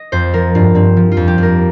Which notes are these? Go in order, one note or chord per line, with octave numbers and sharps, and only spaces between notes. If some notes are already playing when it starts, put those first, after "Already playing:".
Already playing: D#5
F2 C5
F3 A#4
G2 F4
G2 C4
F3
F4
F2
G4
F2 A#4